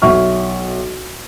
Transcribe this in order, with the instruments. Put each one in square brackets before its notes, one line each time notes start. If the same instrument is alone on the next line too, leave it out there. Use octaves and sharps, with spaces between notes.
[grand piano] B1 E5 C#6 F6